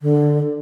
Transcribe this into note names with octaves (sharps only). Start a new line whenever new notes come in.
D3